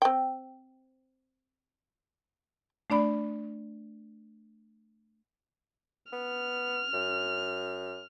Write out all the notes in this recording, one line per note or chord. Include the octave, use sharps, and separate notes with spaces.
C4 G5
A3 D4 D5 B5
B3 F6
F#2